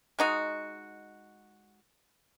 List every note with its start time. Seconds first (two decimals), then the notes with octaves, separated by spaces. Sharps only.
0.19 G#3 D#4 F#4